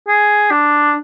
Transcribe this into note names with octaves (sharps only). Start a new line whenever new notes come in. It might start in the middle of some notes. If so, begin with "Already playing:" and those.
G#4
D4